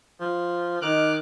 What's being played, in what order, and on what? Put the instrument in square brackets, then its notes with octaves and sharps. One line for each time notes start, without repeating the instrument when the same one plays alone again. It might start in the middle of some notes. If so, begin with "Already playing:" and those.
[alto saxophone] F3
[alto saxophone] D#3 [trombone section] D#4 [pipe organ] D6 F6 F#6